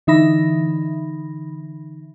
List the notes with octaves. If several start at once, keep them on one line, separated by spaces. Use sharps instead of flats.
D3 E3 D#4 E5 B5 A#6